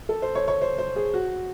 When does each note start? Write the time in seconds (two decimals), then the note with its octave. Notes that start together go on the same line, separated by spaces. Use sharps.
0.09 A4
0.22 C5
0.35 C#5
0.48 C#5
0.62 C5
0.78 C5
0.96 G#4
1.14 F#4